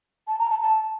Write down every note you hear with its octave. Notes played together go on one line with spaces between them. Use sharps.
A5
A#5
A5
A5